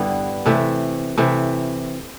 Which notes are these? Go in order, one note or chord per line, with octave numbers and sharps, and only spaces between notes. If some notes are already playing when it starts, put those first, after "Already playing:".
Already playing: G2 D3 G3 B3 E4
C3 E3 A3
C3 E3 A3